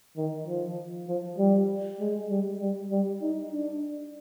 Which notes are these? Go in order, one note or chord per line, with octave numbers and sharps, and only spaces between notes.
D#3
F3
F3
G3
G#3
G3
G3
G3
D#4
D4